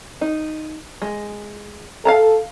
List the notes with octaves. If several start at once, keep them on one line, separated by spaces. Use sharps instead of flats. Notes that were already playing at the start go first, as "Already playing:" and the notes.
D#4
G#3
A4 F5 A5 A#5